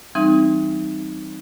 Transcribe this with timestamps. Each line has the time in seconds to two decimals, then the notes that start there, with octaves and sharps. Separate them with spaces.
0.15 E3 G3 C4 D#4